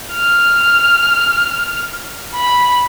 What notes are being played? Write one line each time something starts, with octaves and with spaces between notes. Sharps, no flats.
F6
B5